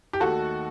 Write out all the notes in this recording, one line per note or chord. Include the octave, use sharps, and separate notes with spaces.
G4
D#2 D#3 A3 F#4 A4